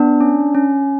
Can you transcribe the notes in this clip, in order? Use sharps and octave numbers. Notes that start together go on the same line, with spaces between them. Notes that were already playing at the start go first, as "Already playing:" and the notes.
Already playing: B3 D4
C#4
C#4